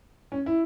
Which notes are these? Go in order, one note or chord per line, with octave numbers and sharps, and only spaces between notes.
C#4
E4